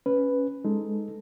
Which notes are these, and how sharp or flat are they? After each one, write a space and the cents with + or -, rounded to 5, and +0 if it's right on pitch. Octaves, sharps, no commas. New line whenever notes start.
C#4 +0 B4 +0
G#3 +0 D#4 +0 A4 +0